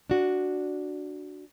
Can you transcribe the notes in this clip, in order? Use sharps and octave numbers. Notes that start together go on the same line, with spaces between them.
D4 F#4